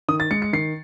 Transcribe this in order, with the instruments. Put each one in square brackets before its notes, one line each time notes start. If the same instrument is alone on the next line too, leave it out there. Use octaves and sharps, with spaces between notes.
[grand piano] D#3 D#6
A6
G#3 C#7
C#7
D#3 C7